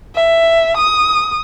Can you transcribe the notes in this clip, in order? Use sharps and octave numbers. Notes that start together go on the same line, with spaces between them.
E5
D#6